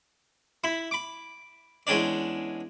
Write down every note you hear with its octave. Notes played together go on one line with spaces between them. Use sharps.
E4 B5
B5 D6
E2 G#3 C#4 D4 D5